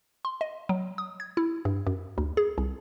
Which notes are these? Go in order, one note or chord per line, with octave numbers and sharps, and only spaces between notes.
C6
D#5
F#3
D#6
G#6
E4
G2
F#2
D2
G#4
C2